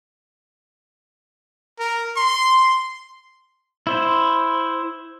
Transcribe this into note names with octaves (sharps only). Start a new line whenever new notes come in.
A#4
C6
E4 C5